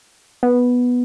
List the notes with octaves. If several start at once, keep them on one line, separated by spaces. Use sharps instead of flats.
B3